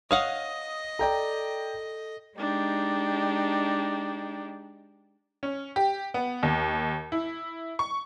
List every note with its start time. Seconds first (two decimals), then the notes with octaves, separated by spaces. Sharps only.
0.11 C#5 D#5 F5 F#5 D#6
0.99 A4 D5 G5 A#5
2.37 G#3 D4 D#4 G4
5.43 C#4
5.76 G4
6.14 B3
6.43 D#2
7.12 E4
7.79 C#6